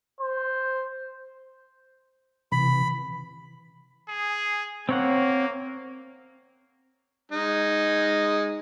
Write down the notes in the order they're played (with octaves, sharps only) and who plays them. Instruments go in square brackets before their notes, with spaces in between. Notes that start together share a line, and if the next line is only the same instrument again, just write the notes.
[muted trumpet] C5
[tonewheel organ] C3 E3 [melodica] B5
[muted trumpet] G#4
[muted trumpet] A#3 [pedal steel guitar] C4 C#5 F#5
[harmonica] G#3 D#4